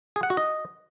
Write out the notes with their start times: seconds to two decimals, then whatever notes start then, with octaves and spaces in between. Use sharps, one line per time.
0.16 G#4
0.23 F#5
0.30 F#4
0.37 D#5